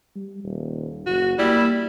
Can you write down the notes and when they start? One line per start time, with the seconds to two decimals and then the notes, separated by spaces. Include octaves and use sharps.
0.15 G3
0.44 D#1
1.06 F#1 F#4
1.39 G3 A#3 E4